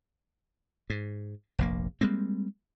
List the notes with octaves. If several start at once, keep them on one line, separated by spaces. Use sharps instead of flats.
G#2
F1 A#1 A#3
G3 G#3 A#3 C4